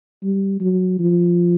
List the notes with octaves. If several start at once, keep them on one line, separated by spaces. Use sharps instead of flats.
G3
F#3
F3